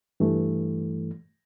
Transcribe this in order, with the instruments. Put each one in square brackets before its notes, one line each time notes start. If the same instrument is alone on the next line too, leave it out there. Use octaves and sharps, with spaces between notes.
[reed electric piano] G2 E3 A3